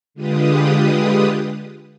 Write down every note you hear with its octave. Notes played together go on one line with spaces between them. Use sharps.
D3 G#3 F4 G4 B4 D#6